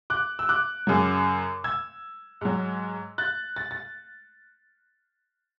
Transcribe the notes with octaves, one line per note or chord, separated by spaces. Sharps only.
D6 F#6
E6
D6 F#6
F#2 C#3 F#3
E6 G#6
G#2 F#3
F#6 A6
A6
A6